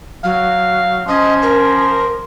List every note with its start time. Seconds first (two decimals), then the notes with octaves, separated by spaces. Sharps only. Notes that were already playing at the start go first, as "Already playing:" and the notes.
0.24 F#3 F5
1.07 F3 C#4 D#5
1.42 A#4